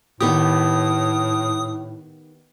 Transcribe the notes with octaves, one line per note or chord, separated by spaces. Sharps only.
A2 D#3 B3 G4 D#6